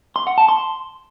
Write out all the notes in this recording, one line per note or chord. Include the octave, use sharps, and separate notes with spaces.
C6
F#5
A5
C6